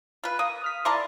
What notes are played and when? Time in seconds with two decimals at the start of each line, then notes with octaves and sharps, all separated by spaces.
0.24 F4 B4
0.39 A#3 D#6
0.62 D#6 F6 B6
0.85 E4 A#4 D5 A5 C6